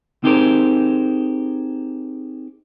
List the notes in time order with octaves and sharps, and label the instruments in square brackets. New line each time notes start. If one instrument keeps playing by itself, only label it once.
[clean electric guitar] C4 D#4 G4 G#4 A#4 C5